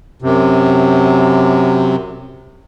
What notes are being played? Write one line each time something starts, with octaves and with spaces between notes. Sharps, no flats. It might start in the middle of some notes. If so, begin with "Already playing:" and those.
F#2 C3